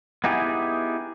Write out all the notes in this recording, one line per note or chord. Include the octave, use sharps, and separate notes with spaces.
B3 D#4 E4 G4 G#4